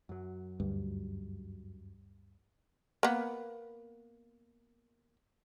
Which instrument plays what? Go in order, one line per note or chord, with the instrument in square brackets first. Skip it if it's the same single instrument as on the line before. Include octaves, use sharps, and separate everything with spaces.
[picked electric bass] F#2 F#3
[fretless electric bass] D2 G2
[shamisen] A#3 B3